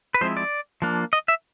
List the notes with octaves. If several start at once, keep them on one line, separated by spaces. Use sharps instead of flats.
B4
F3 G#3 C4 E4 C5
D5
F3 A#3 D4
D#5
E5